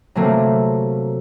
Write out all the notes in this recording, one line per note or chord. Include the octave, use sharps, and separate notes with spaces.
C3 F#3 A3 A#3